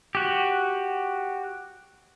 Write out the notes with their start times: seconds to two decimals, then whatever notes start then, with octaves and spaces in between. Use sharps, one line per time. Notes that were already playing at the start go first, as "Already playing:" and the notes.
0.15 F#4 G4